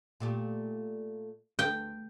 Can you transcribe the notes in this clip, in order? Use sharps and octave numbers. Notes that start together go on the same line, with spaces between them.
A#2 A3 G4
D2 G5